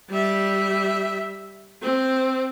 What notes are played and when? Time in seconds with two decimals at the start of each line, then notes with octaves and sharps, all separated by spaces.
0.10 G3 E5
1.82 C4